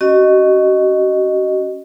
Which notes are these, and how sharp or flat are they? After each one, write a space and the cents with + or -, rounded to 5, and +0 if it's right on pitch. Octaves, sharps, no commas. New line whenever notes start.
C#4 +0 F#4 +35 D#5 -5